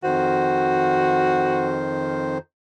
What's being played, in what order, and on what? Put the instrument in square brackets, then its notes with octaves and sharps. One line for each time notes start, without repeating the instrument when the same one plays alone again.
[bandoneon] F2 D#3 C5 [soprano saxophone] F#4